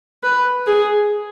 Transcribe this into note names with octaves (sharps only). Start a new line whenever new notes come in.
B4
G#4